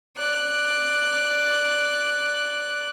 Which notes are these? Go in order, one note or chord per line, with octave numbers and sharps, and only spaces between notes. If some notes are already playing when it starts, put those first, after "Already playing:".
D5 F#6